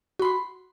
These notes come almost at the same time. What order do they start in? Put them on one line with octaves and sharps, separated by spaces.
F#4 B5 C6